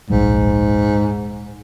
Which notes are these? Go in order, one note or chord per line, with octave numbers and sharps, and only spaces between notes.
D1 A#1 G#2 G3